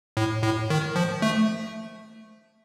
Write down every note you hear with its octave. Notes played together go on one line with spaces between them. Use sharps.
A2
A2
D#3
F3
A3